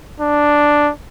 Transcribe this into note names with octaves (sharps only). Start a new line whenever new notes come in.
D4